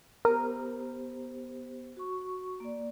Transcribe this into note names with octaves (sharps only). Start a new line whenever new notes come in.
B3 G4 A#4 C5
F#4 C#6
A#3 D5